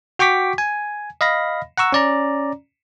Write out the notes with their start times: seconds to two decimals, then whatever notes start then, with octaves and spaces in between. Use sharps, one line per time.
0.19 F#4 G5 C#6 D6 B6
0.58 G#5
1.21 D#5 F5 B5 A#6
1.78 F#5 A#5 C#6 E6
1.92 C#4 D5 A#5